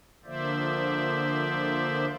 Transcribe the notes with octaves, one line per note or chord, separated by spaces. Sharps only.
D3 F3 A#3 C5 D5 E5